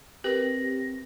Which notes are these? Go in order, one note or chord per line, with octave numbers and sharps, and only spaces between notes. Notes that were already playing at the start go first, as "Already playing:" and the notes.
C4 G4 A#4 B4 A#6